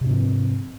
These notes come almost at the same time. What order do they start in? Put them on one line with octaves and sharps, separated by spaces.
C3 G#2 C4 F3